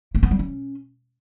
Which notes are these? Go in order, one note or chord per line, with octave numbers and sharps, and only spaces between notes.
A#3
B3
G3
C#4